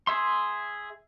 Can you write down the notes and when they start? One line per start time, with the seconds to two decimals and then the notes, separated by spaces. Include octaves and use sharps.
0.07 G#4 E5 C6